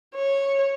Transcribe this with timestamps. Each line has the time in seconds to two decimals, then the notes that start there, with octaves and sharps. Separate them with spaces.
0.15 C#5